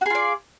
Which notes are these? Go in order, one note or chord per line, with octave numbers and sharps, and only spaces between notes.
F4 F#4 G#4 D5